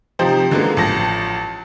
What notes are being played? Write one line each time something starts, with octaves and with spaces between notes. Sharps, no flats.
C3 F3 D#4 G4 C5
D3 F#3 G#3 A#3 B3
A1 F3 A5 A#6